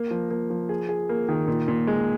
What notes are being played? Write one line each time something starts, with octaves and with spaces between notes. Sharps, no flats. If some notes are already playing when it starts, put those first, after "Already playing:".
Already playing: A#3
F3
A#3
F3
G#4
G#4
A#3
D#3
A#2
A#2
G#3